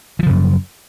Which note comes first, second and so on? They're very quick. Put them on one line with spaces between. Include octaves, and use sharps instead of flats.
E3 F3 C#3 F#2